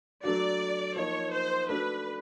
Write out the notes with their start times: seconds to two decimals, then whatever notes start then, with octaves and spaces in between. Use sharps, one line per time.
0.24 F#3 A3 D4 F#4 D5
0.96 F3 A#3 D#4 C#5
1.32 C5
1.69 A3 D4 F#4 B4